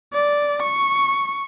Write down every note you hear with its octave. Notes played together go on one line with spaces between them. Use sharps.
D5
C#6